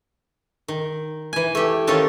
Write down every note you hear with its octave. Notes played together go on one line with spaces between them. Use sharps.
D#3
E3 G#5
A3 G4
D#3 C#4 F4 A4 A5